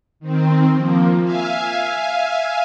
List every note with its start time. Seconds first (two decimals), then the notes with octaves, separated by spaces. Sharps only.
0.20 D#3 C4
0.74 F3 A#3
1.22 E5 F5 G#5